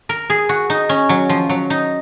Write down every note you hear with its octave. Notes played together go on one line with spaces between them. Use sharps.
A#4
G#4
F#4
D#4
C#4
F#3
F3
F#3
D#4